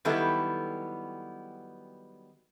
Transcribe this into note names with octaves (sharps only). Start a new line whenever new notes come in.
D#3 F#3 G3 B3 E4 A4